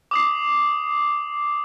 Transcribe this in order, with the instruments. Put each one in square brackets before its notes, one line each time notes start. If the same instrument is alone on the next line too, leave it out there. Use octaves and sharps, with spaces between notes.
[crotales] D6 D#6 C7